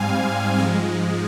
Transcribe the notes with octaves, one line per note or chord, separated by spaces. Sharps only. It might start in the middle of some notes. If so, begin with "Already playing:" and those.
Already playing: G#2 G3 C4 F5 G#5
G#2 F3 G#3